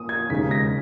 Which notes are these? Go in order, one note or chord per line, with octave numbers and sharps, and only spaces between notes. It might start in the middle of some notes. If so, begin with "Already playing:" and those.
Already playing: A#2 D#6
G#6
E1 D#2 C#3 G#3 D#4 B6
A#6